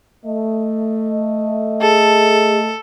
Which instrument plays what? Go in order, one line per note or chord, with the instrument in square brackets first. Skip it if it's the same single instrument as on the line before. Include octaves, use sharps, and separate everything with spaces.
[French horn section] A3 D#5
[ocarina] G#4 [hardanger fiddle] A4